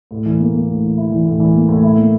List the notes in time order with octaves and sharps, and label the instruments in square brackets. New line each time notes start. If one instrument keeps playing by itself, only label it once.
[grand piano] A2
E3
A#3
A#3
A2
E3
E4
E3
A2
E3
A#3
A2
E4
A#3